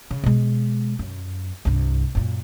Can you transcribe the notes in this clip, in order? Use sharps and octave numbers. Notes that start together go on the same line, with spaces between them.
C#3
B2 G#3
F#2
C2 G2
F#2 A#2